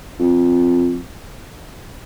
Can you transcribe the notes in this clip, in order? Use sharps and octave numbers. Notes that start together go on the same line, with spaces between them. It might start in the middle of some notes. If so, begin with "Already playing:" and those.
F2